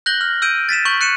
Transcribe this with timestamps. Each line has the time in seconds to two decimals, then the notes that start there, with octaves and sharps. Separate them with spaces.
0.06 F#6 G6 A#6 F#7 G7
0.21 F6
0.42 E6 G6 D7 D#7
0.69 A6 B6 D#7 E7
0.85 C#6 G6 F#7
1.01 F#6 C#7 D#7 E7